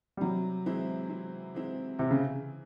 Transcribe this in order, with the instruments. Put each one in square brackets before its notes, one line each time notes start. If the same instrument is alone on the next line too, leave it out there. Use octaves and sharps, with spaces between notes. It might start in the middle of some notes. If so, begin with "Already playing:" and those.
[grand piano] G3
[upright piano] C3 [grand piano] F#3
[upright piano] E3 G#3 C4 E4
C3
E3 G#3 C4 E4
[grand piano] C3 [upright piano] E3
[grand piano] C#3